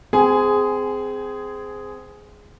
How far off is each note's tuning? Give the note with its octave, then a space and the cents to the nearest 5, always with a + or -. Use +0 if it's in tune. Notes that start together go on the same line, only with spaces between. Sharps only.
C4 -25 G#4 +0 G#5 +10